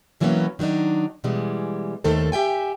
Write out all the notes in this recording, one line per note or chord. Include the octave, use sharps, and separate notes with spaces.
B2 E3 F#3 A#3 B3 C#4
D#3 F#3 A#3 D4 D#4
B2 E3 G3 G#3
D#2 D#3 A3 A4 C5
G4 E5 G5 G#5